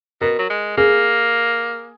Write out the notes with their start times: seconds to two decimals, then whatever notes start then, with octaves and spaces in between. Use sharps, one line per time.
0.21 B2 A#4
0.39 F#3
0.50 G#3
0.77 A#3 G#4